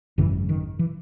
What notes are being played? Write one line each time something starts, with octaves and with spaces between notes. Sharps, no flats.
G#1 F#2 C#3 E3
D#3
E3